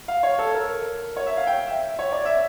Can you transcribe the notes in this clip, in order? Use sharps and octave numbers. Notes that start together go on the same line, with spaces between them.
F5
C#5
A4
A#4
C#5
E5
F5
G5
E5
C#5
D5
E5